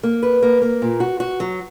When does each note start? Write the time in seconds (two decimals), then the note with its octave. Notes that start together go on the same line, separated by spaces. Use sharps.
0.03 A#3
0.23 B4
0.42 A#3
0.62 A#3
0.82 A#2
1.00 F#4
1.20 F#4
1.40 F#3